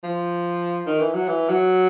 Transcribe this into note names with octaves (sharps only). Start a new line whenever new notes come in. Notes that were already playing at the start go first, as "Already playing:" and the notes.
F3
D#3
E3
F#3
E3
F#3